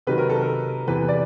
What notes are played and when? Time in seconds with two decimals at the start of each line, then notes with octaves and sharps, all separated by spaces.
0.07 C3 D#3 F#3 B4
0.18 A#4
0.30 A4
0.41 A#4
0.87 E2 C3 E3 B4
1.09 D5